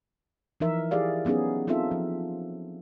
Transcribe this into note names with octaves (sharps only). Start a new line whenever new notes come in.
E3 F3 D#4 A#4 E5
E4 G4 G#4 D5 F5
F#3 B3 C#4 D#4 G#4
B3 C4 D#4 F4 A4 E5
F3